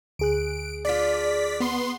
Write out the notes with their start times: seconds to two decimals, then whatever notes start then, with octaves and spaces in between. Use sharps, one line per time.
0.19 D2 G#4 F#6 D7
0.85 D4 F4 D5 B6
1.60 B3 C6